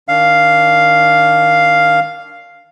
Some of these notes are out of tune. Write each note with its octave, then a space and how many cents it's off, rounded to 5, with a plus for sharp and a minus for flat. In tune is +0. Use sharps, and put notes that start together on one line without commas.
D#3 +0 D4 -25 F5 +0